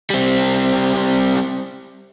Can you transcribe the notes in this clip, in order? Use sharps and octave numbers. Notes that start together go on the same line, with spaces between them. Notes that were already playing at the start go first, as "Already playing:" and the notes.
G3 C4